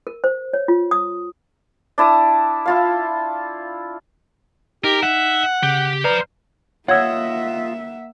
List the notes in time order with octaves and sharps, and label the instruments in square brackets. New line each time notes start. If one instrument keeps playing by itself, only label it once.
[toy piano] A#4
C5
C#5
F4
D#6
[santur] D4 E4 A5 D#6
E4 F4 F5
[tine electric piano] D#4 [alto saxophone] G4 [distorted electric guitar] A#4
[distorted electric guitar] E5 [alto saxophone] F#5
[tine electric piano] C#3 [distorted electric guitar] G4
[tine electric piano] B4 D5 A#5 [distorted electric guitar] C5 F5
[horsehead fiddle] A#3 E5 [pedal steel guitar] F4 D#5 [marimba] C#5 G#6 [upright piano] F#5 E6